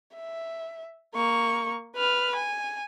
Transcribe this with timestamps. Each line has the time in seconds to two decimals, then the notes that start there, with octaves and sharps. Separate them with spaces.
0.16 E5
1.15 A#3 C#6
1.96 B4 F6
2.36 G#5